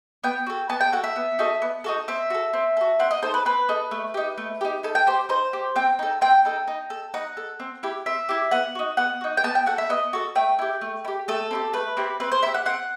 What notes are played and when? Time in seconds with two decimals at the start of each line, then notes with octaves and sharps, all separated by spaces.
0.24 B3 G5
0.47 F#4 A4
0.70 B3 A5
0.81 G5
0.92 F#4 A4 F#5
1.04 E5
1.16 B3
1.39 D#4 F#4 A4
1.62 B3
1.84 D#4 F#4 A4
2.08 C4 E5
2.30 F#4 A4
2.53 C4
2.77 F#4 A4
3.00 C4 F#5
3.11 D#5
3.22 D#4 A4 C5
3.34 B4
3.45 C4 B4
3.69 D#4 A4
3.91 A3
4.14 D#4 G4
4.38 A3
4.61 D#4 G4
4.83 D#4 A4
4.95 G5
5.07 G4 C5
5.29 D#4 C5
5.53 G4
5.76 C4 G5
5.99 D#4 A4
6.21 C4 G5
6.45 D#4 A4
6.68 D#4
6.90 A4
7.14 D#4 F#5
7.37 A4
7.60 C4
7.83 E4 G4
8.06 C4 E5
8.29 E4 G4
8.51 B3 F#5
8.75 D#4 F#4
8.97 B3 F#5
9.21 D#4 F#4
9.37 G5
9.44 B3 A5
9.55 G5
9.66 F#4 A4 F#5
9.78 E5
9.89 B3 D#5
10.13 F#4 A4
10.35 A3 G5
10.59 E4 G4
10.81 A3
11.05 E4
11.08 G4
11.28 A3 A4
11.51 C4 E4 G4
11.74 A3 B4
11.97 C4 E4 G4
12.20 C4 B4
12.32 C5
12.43 E4 E5
12.46 G4
12.54 F#5
12.66 C4 F#5